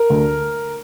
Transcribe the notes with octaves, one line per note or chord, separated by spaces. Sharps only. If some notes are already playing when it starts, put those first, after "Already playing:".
Already playing: A#4
D2